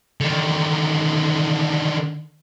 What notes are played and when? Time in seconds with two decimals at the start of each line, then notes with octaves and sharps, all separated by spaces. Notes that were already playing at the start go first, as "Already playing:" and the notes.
0.21 D3 D#3